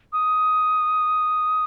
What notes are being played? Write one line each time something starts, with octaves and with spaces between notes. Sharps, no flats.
D#6